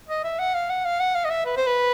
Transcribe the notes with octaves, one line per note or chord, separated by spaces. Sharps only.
D#5
E5
F#5
F5
F#5
F5
F#5
F5
D#5
E5
B4
C5
B4